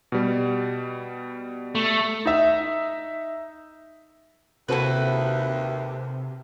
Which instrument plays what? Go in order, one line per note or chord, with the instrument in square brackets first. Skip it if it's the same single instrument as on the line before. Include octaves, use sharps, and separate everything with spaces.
[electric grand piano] B2 G3
[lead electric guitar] A3
[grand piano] D#4 E5
[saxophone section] D#2 [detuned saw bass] C3 [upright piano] C4 F#4 A4 [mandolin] E4 B4